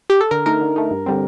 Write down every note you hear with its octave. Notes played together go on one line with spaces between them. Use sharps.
G4
A4
D3 A#4
A3 D#4 A#4
D3
A3 D#4
G2
D3 G3 C4